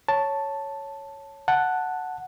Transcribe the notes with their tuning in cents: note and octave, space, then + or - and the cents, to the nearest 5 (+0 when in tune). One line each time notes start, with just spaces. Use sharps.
C#5 +0 A5 +0
F#5 -5 A5 +0